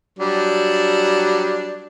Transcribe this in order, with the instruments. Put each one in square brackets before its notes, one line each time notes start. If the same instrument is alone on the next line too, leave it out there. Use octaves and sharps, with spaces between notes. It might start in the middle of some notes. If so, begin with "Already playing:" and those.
[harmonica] F#3 G3 D4